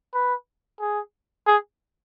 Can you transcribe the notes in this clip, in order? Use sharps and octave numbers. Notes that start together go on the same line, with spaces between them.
B4
G#4
G#4